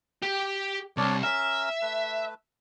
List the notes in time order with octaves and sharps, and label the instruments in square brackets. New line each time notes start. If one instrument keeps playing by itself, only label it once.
[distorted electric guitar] G4 [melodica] G5
[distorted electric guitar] C2 [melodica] D4 C#5 D5
[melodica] C#4 A#4 A#5 [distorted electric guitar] E5
[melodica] A3 B4